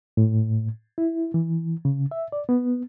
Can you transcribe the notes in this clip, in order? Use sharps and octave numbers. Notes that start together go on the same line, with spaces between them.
A2
E4
E3
C#3
E5
D5
B3